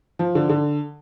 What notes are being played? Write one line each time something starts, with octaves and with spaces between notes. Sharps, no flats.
F3
D3
D3